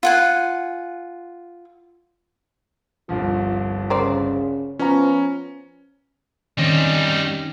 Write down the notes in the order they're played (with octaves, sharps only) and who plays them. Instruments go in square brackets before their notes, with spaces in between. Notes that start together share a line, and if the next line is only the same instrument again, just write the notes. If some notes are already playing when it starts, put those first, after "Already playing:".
[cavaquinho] F4 F#5 G#5
[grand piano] G1 C2 F3 [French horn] F4
[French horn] C#3 [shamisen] A#4 C5 D5
[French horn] F3 [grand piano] B3 C#5 A#5 [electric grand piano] C#4
[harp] D#3 C4 C#4 [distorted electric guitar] G3 D#4